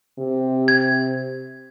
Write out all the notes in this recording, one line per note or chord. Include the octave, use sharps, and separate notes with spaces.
C3
G#6